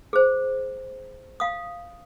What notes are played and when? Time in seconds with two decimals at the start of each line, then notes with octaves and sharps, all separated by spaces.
0.13 G#4 C5
1.40 F5 D#6